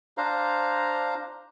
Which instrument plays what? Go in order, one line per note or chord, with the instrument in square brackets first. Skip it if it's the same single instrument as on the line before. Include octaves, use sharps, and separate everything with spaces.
[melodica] D4 C5 F5 A#5